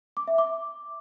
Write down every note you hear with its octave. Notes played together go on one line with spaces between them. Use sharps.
D6
E5
D6